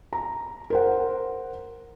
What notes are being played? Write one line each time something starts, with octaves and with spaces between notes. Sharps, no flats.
A#5
A#4 C5 F#5